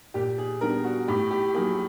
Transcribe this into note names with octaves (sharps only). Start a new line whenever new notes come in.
A#2 G4
G#4
G3 B3 D4 A#4
F#4
A2 G4
G4
F#3 A#3 G#4